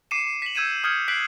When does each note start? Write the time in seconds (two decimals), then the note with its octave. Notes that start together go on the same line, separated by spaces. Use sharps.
0.11 D6 C7 C#7 D#7 E7
0.42 B6 F#7
0.55 E6 G6 G#6 C#7 D#7 E7
0.84 D#6 F6 G6 G#6 C#7
1.08 F#6 B6 C7 D7 F#7